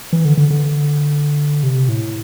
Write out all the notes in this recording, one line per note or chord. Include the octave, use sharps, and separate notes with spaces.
E3
D3
D3
D3
C3
A2